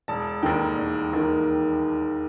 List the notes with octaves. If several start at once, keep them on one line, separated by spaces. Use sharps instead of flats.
E1 A5
D#2 D#3 G5
E1
D#2 D#3